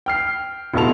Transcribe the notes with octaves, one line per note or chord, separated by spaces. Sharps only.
G5 F6 C7
F1 B2 E4 A4 A5 F7